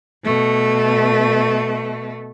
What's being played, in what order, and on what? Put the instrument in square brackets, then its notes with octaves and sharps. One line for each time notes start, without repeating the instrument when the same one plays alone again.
[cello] B2 A3